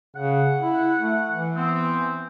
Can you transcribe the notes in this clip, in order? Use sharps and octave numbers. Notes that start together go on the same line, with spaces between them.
C#3 F#5
E4
A3
E3
B3 C4